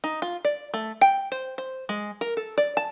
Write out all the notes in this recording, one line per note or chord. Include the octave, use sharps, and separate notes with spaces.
D#4
F4
D5
A3
G5
C5
C5
G#3
A#4
A4
D5
A5